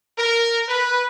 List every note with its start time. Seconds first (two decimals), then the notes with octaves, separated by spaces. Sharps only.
0.18 A#4
0.69 B4